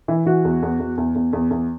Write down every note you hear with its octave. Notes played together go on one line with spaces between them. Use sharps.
E3
E3 F#4
E2
E2
E2
E2
E2
E2
E2